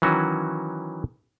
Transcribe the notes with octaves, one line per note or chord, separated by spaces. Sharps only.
D#3 E3 F#3 C#4 F#4